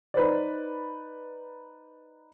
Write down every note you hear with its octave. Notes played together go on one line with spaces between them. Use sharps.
D#4 B4 C5 D5